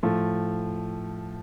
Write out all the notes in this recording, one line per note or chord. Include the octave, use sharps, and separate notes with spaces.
A2 F3 A3